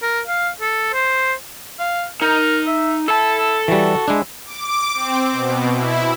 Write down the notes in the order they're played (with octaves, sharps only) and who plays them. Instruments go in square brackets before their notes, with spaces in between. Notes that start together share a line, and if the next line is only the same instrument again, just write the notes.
[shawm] A#4
F5
A4
C5
[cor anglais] F5
[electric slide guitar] D#4 [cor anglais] A#4
[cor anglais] E5
[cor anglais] E4 [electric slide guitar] A4 A5
[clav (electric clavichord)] E3 G3 [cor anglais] F#4
[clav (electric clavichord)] G#3 D4 [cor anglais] E4
[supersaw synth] D6
C4
B2
E4